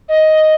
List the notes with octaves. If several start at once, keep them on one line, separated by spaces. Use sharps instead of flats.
D#5